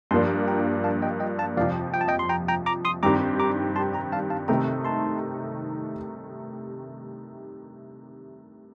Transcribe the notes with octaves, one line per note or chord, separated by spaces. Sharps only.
G2 F3 A#3 D4 A5 C6
G5 A#5
F5 A5
D#5 G5
D#5 G5
F5 A5
F2 C3 F3 D5 F5
G5
A5
D#5 G5
C6
G5 A#5
G5 A#5
A#5 D6
C6 D#6
G2 D#3 G3 C4 G4 A#5 D6
A#5 D6
A5 C6
G5 A#5
F5 A5
F5 A5
C3 D#3 A3 C4 D#4 G5 A#5
A5 C6